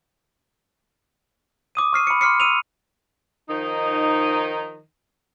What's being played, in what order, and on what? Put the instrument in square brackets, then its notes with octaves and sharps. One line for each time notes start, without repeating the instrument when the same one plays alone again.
[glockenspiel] D6 D#6 D#7
C#6 F6 C7 D#7
B5 C#7
C6 D6 F6 C7 C#7
E6 D#7 F7
[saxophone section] D#3 F3 D#4